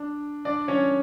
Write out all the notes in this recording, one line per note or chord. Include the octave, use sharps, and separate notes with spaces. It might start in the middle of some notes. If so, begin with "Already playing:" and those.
Already playing: D4
D4 D5
C#4 C#5